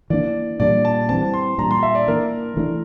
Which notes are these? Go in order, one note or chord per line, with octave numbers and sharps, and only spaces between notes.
E3 A#3 D4 D5
A#2 G3 A#3 D4 D5
A5
E3 G3 C4 A5
C6
A#2 G3 D4 A#5
C6
E5
D5
E3 A#3 D4 A#4
E3 A3 D4